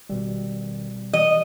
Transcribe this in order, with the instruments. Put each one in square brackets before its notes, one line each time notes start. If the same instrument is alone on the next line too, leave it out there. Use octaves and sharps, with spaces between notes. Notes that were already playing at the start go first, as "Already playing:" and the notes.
[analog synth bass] G#1 [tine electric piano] B2 G3
[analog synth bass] E3 [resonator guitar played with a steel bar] D#5